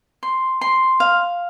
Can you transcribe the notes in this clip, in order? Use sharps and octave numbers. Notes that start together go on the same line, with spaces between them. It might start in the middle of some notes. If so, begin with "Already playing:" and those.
C6
C6
F5